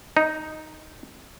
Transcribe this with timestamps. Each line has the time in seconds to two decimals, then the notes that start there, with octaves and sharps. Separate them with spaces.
0.17 D#4